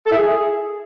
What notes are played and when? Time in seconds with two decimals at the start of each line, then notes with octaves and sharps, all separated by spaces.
0.05 A4
0.11 E4
0.17 G#4